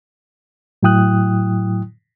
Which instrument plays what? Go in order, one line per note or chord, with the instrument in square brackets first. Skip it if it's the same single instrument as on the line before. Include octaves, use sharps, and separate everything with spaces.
[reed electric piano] A2 F#3 E4 G5 D#6 F#6